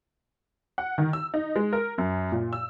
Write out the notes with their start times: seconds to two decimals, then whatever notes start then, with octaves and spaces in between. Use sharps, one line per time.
0.78 F#5
0.98 D#3
1.13 E6
1.34 D#4
1.56 G#3
1.73 A#4
1.98 F#2
2.32 A#2
2.53 E6